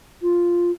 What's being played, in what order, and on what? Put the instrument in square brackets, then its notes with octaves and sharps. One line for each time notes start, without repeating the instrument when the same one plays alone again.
[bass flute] F4